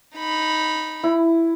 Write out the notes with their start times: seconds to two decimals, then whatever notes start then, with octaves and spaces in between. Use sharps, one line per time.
0.17 D#4 B5
1.03 E4